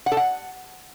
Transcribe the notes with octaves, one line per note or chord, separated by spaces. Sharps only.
F#5
A4
F#5